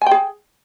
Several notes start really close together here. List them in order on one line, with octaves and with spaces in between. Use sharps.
G#5 G5 G#4